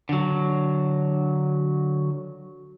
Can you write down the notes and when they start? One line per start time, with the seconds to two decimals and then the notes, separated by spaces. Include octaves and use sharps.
0.09 D3 F#3